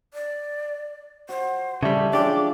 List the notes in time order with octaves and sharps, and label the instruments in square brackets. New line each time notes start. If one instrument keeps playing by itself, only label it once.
[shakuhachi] D5
[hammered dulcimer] F#4 [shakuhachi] C5
[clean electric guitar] C#3 G3 [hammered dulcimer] E3 D5 C#6 [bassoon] A3
[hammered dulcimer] F3 G#3 C#4 [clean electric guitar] D4 G4 [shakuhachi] D6